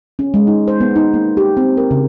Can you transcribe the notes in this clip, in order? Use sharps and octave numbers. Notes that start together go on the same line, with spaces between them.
C#4
G#3
D#4
C5
B3
D#4
A#3
G4
C4
A#4
C#3